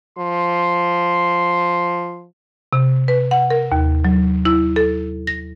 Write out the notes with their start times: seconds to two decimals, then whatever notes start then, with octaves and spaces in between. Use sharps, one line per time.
0.19 F3 C6
2.73 C3
3.08 B4
3.31 F#5
3.50 A#4
3.72 D#2
4.05 F#3
4.45 E4
4.76 A4
5.27 A#6